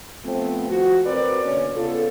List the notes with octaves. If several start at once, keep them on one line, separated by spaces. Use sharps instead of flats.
F3 A3 B3 C4
F3 F#4
C4 A#4 B4 D5
B2 D3 A#3 C#4
C#3 B3 F4 A4